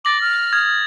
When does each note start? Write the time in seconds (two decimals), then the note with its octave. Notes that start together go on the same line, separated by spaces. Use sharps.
0.05 D6 A6 A#6 F#7
0.21 F6
0.53 D#6 G#6